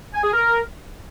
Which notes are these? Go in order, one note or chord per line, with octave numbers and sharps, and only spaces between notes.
G#5
G#4
A#4